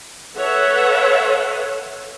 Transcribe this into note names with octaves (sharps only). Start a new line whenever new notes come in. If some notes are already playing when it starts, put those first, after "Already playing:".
A4 B4 C#5 E5 F#5